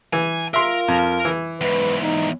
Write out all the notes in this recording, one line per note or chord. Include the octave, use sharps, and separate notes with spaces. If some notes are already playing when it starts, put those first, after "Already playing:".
E3 G#5
F4 A#4 E5 C6
F2
E3
E2 G#2 B4
D#4